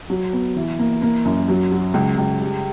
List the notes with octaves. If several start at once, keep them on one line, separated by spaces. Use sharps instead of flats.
F#3
B3
E3
A#3
A#3
F#2
F#3
F#3
C#2
C#2
G3